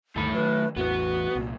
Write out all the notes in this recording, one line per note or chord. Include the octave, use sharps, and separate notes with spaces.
D2 G2 D#3 A3 B5
D#3 F#3 B4
A1 E2 E3 B3 F#4 B4
C2 A#2